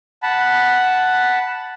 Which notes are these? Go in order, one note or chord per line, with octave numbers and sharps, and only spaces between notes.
F#5 A5 B5